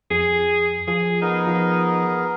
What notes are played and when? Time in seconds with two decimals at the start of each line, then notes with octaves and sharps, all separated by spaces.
0.10 F2 G#4
0.88 F3 G#4
1.21 B3 D#4 G#4 A#4
1.47 F3